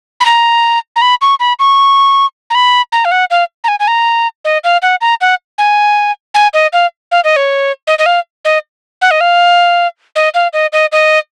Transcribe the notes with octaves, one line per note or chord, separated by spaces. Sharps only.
B5
A#5
A#5
B5
C#6
B5
C#6
A#5
B5
A#5
F5
F#5
F5
A#5
G#5
G#5
A#5
D#5
F5
F#5
A#5
F#5
G#5
G#5
D#5
F5
F5
D#5
C#5
D#5
D#5
F5
D#5
F#5
D#5
F5
D#5
F5
D#5
D#5
D#5